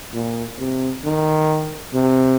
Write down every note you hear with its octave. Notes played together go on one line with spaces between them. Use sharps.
A#2
C3
D#3
C3